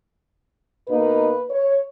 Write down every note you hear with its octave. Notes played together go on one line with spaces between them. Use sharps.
B2 A#3 D#4 B4
C#5